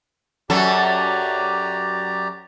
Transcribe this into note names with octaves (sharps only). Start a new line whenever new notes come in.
F#2 F#3 G4 A4 D5 A#5